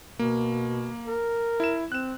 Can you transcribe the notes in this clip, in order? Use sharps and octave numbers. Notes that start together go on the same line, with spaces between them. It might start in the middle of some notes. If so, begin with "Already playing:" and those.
B2 A#3
A#4
E4 E7
C4 F#6 E7